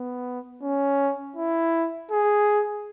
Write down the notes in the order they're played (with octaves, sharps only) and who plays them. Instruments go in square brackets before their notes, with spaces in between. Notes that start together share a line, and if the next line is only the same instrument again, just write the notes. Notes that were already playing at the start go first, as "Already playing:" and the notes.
Already playing: [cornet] B3
C#4
E4
G#4